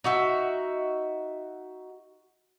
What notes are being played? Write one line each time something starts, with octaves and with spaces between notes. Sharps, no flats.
D#4 F#4 E5